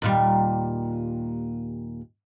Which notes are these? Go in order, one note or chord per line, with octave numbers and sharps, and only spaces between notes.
D#2 A#2 G3